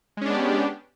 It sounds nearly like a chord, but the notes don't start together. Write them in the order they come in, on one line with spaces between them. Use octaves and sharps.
G#3 C#4 D4 B3 G4